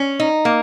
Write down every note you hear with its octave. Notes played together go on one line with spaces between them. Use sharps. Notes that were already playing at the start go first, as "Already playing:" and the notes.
Already playing: C#4
D#4
A#3